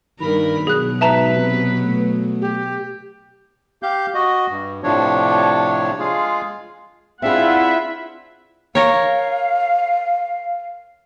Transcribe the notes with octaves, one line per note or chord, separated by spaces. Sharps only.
G2 D#3 A#4 B5
B2 F#3 G#4 F#6
G#2 B4 E5 A5 A#5
C3
A3
G4
G4 F5 G6
F#4 D#5
G2
A2 C3 F3 D4 C#5
G#3 F4 G#4 F5
C4 D4 E4 F4 G#4 E5 F#5
A#4 C#5 F5